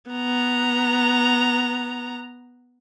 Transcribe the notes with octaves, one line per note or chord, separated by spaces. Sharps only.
B3 A#5